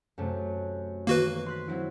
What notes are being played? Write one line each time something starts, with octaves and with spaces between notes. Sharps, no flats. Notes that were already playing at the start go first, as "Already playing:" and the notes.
F#2 C3 A3
D#3 A#3 F#4 B4
C6 F#6 B6
F#3 C4 E4